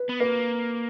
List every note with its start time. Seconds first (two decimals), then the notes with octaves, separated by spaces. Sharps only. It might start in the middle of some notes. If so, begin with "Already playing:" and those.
Already playing: B4
0.09 B3
0.20 A#3 B4